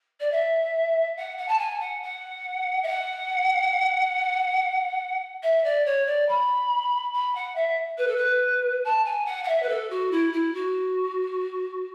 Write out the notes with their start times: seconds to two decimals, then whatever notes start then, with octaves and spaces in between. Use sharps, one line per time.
0.20 D5
0.32 E5
1.17 F#5
1.37 F#5
1.48 A5
1.59 G#5
1.80 F#5
2.02 F#5
2.83 E5
2.87 F#5
5.43 E5
5.64 D5
5.86 C#5
6.06 D5
6.28 B5
7.13 B5
7.35 F#5
7.55 E5
7.98 B4
8.07 A4
8.16 B4
8.84 A5
9.05 G#5
9.25 F#5
9.44 F#5
9.48 E5
9.62 B4
9.69 A4
9.90 F#4
10.11 E4
10.32 E4
10.54 F#4